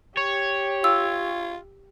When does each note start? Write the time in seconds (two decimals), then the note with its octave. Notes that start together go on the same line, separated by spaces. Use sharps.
0.17 G4 C#5
0.84 F4 E6